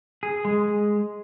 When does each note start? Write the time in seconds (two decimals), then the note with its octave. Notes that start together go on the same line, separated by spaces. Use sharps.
0.23 G#4
0.45 G#3